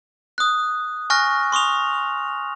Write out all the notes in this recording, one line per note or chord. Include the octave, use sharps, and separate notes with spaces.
D#6 F#6
G#5 C#6 F6 F#6 A#6
C6 C#6 D#6 F7